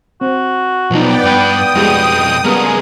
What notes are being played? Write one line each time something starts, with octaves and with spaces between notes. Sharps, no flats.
C4 F#4
B1 F3 B3 D#4 D5 G5
G2 B4 G5 D#6
F2 B2 G3 G#3 E4
G2 C#3 G3 B3 G#4 A#4